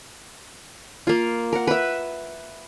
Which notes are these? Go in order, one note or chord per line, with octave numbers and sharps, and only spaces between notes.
A#3 F4
A#4 F#5
B4 E5